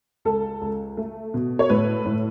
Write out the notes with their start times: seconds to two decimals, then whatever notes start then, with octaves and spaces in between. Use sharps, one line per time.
0.25 C#2 A4
0.61 C#2
0.97 A3
1.34 B2
1.59 C#5
1.70 A2 B4
2.06 A2